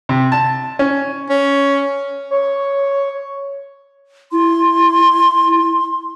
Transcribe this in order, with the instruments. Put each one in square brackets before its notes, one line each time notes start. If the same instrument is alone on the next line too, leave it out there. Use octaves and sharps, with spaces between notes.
[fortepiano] C3
A5
C#4
[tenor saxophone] C#4
[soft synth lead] C#5
[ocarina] E4 [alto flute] C6